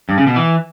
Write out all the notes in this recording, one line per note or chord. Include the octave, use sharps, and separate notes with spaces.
G2
C#3
B2
E3